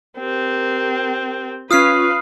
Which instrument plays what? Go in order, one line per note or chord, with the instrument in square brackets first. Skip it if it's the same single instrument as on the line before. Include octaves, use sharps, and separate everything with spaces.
[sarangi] C4 [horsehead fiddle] G4 A#4
[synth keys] C#4 F4 [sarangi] B4 [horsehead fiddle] F5 [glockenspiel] D#6 F6 C7